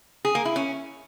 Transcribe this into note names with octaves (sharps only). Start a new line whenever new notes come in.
G#4
A#3
E4
C#4